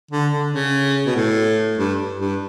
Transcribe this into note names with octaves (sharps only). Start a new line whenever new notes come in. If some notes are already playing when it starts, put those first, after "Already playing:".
D3
D3
C#3
B2
A2
G2
G2